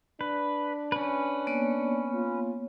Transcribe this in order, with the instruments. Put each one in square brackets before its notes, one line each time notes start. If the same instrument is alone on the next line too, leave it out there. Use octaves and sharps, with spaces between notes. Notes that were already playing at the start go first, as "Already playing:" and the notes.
[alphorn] D4 [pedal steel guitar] B4
[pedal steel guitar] C#4 B4
[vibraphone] A#3 B3 C#5
[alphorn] F4